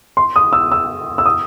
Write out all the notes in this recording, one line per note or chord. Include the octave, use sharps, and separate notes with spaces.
C6
D#6
E6
E6
E6
D#6